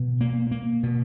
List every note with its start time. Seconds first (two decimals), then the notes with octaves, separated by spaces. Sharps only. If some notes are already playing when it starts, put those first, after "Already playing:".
Already playing: B2
0.21 A#3
0.51 A#3
0.83 B2